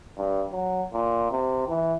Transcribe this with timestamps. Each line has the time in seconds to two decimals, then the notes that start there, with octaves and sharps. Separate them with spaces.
0.17 G2
0.52 F#3
0.93 A#2
1.31 C3
1.68 E3